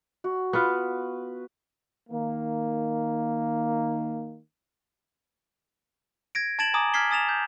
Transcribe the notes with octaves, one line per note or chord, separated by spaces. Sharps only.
F#4
B3 F4 B4
D#3 A#3
G#6 A#6 D7
A5 G#6 A6 D7 E7 F#7
G#5 A#5 D6 D#6
F6 G#6 B6 C7 G7
G#5 D#6 A6 E7 F7
G6